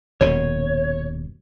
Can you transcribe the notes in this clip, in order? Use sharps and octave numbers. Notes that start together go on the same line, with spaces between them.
D#1 F#2 B2 C#5